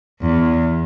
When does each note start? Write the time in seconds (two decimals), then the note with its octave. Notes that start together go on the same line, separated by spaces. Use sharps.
0.21 E2